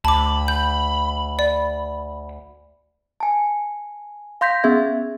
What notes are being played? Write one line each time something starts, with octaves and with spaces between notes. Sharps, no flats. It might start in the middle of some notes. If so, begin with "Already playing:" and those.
D2 A5 B5 D6
G6
D5
G#5 A5
F5 C6 G6 A#6 B6
B3 C#4 G#4 E5 G#6